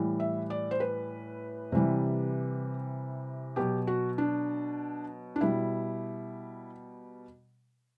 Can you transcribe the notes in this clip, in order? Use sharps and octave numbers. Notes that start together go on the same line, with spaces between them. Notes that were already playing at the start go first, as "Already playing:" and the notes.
Already playing: A2 E3 G3
E5
D5
C5
B4
C3 E3 G3
B2 F#3 G4
F#4
D4
D4
B2 G3 E4